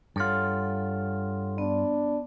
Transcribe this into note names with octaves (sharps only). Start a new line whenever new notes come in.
G2 F4 A4 C#5 F#5
B3 D4